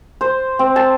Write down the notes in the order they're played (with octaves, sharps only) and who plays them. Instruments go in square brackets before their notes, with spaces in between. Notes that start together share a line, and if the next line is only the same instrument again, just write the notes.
[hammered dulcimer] C5
C4
A5